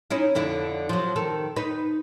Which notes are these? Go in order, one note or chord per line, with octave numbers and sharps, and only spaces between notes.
C#4 D#4 E4
F2 D3 E4
F3 F#3
D#3 A4
D#4 B4